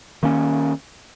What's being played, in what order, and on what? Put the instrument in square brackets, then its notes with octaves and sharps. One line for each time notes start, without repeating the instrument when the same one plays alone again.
[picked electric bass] D#3 A#3 C#4